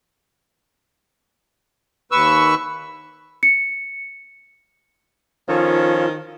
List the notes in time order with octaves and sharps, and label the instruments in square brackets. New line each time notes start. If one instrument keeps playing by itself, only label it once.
[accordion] D#2 B4 C#6 E6
[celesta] C#7
[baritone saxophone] D#3 [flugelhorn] F3 [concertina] C#4 A4 C#5 [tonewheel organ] F4